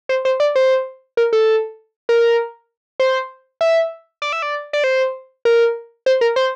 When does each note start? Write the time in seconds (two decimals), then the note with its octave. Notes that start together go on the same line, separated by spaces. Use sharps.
0.09 C5
0.25 C5
0.40 D5
0.56 C5
1.17 A#4
1.33 A4
2.09 A#4
3.00 C5
3.61 E5
4.22 D5
4.33 E5
4.42 D5
4.73 D5
4.84 C5
5.45 A#4
6.06 C5
6.21 A#4
6.36 C5